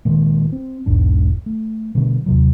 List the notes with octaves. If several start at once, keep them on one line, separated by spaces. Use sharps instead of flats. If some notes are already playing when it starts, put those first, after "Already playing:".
A#2 D#3 G#3
C4
E1 B1 G#2 D4
A3
B2 D3 G3
D#2 C3 F#3